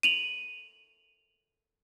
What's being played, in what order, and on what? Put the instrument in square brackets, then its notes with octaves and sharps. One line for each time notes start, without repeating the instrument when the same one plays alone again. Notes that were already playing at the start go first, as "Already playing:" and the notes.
[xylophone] D#7 F7 F#7